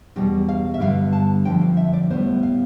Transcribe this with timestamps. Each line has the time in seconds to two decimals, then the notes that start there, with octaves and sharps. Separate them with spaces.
0.16 E2 B2 G3 G4
0.49 F5
0.74 E5
0.80 G2 D3 G3 B3 F5
1.13 A5
1.45 F2 D3 F3 G5
1.61 F5
1.77 E5
1.93 D5
2.10 A2 G3 B3 C5
2.43 F5